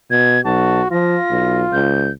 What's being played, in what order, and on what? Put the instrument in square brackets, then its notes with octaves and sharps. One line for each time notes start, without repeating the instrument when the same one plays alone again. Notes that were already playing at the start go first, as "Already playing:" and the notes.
[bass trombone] B2 [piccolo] G#6
[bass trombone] B1 [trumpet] F#4 [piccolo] A5
[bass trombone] F3 [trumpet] F4 [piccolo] A#6
[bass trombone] B1
[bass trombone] C#2 [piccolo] G6